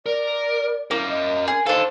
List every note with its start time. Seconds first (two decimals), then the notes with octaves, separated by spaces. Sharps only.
0.06 A#4 D5
0.91 A#3 C#4 E4 A#4
1.09 D#5
1.48 G#4 A#4
1.66 D4 D#4 A4 C5 F5